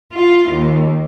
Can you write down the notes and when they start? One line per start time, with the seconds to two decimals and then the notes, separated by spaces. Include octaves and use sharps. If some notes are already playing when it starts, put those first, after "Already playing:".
0.14 F4
0.52 D#2